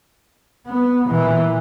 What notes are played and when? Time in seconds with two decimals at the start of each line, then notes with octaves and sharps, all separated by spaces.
0.66 B3
1.09 A#2 E3